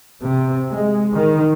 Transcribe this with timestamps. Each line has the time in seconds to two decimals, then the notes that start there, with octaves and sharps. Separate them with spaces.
0.24 C3
0.72 G#3
1.16 D#3